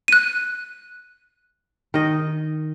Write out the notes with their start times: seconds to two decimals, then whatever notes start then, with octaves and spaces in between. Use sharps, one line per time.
0.08 F#6 D#7
1.94 D#3 D#5